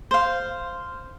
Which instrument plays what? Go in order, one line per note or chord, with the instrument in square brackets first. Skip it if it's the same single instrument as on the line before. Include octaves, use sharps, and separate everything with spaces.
[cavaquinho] C5 F5